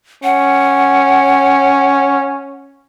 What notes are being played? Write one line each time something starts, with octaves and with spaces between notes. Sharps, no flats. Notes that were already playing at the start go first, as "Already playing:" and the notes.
C#4 F#5